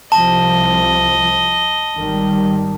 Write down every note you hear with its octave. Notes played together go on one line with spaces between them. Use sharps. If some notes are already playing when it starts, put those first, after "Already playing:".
C2 C3 F3 D#5 A5
G#1 D#3 G3